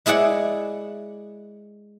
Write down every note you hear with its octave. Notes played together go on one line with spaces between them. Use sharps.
G#3 E4 G#4 D5 F#5